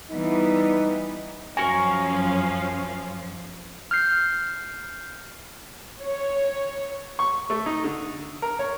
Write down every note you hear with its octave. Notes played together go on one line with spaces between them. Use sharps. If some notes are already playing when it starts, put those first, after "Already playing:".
E3 G3 B3 D#4
F#2 F3 C#4 F#4 A#4 F5 G#5 C#6
F6 G6 C7
C#5
C#6
A3
D#4
D3
A#4
C#5